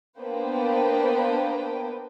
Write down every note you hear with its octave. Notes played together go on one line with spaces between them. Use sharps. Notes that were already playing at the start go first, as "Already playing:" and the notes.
A#3 B3 D4 B4 C5 G5